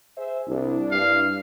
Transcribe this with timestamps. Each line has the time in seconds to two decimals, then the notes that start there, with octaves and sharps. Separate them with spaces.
0.17 G#4 C5 E5
0.48 C2 D4 E4
0.91 G2 F5